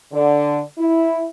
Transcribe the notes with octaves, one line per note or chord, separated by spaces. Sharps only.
D3
E4